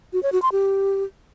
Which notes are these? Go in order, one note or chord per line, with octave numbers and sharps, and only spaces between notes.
F#4
C#5
F#4
C6
G4